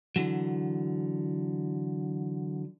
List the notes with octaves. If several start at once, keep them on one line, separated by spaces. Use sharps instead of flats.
D3 E3 F#3